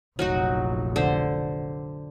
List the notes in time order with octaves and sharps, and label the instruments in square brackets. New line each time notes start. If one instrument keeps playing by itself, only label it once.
[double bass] F1 A#1 [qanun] F#3 D#4 F#4
[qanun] D3 C5